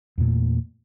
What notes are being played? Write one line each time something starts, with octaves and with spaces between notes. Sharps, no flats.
E2 A#2 A3